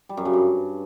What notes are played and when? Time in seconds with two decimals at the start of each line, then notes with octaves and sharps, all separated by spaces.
0.09 G3
0.17 F#2
0.25 C#3
0.33 G2